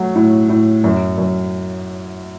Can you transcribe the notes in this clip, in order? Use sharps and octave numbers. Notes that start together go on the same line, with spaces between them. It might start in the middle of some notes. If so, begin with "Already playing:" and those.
Already playing: F#3 A3
A2
A2
F#2
F#2